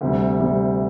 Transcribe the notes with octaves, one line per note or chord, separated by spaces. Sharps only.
D2 C3 G3
C3 G3